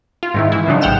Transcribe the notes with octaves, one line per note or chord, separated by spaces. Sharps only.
F4
G#2 D#3 E4
E3 E4
C#3 F3 F#3 D4 D#4
A1 G#2 F#5 G5 F6 E7